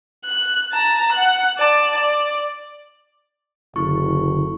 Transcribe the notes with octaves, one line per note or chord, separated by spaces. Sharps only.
F#6
A5 A#5
F#5 F#6
D5 A5
D5
F#1 D3 E4 C#6